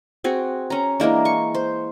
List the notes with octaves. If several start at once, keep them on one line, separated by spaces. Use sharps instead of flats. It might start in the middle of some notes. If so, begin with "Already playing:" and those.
C4 F#4 G#4
C#4 A#5
E3 G#3 A#3 D4
C#6
C5